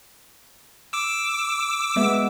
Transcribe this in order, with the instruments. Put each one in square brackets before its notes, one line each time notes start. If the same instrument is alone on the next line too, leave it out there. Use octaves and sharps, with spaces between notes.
[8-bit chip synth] D6 E6
[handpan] G#3 B3 E5